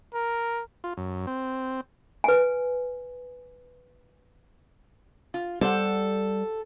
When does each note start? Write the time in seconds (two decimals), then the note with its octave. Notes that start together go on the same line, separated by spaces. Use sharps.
0.14 A#4
0.84 F4
0.97 F#2
1.27 C4
2.24 B4 G#5
5.34 F4
5.61 G3 G4 A4 C5 F#5